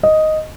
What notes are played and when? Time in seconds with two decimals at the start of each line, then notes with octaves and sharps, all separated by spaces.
0.03 D#5